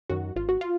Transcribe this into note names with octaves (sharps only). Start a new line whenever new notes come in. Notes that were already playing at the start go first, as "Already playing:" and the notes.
F#2 D#3 F#4
G#1 F4
F#4
F4